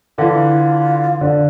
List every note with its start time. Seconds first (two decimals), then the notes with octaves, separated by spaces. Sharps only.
0.18 D3 E3 F4
1.21 D3